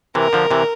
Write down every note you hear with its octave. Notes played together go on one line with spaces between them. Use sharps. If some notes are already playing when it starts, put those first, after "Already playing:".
C3 E3 A#4
D3 F3
C3 E3